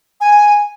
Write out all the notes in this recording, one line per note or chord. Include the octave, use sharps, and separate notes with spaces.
G#5